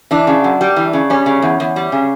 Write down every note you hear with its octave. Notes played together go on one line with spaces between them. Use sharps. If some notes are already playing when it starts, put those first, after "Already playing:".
E3 D4
C#3
F#2
G3
E3
C#3
G3 C#4
C#3
E2
E2
G3
C#3